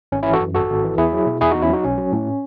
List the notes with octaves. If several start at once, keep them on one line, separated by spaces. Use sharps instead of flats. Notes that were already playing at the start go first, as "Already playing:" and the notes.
G#1 C#4
E3 C#4 E4
F#4 A4
F#2
G#1 F#4 A4
G#1
E3
E2 E4 G#4
F#3
B2
E2 E4 G#4
E2 D#4 F#4
C#4 E4
F#3 D#4 F#4
B1 C#4
F#3
A2